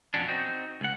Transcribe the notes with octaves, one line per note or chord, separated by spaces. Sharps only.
F2 B2 F#3 C#4 D4
C4 D#4 F#4
C#2 F#5